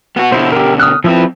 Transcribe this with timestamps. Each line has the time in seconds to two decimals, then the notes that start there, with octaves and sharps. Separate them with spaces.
0.17 B3 F#4
0.32 B2 D3 E4 C5
0.52 G4 A#4
0.80 D#6 F6 F#6
1.04 F2 F3 C4 E4 B4